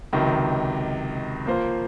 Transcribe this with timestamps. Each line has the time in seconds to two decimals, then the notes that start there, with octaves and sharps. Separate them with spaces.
0.13 C#2 C3 D#3 F#3
1.46 F3 A#3 F4 C5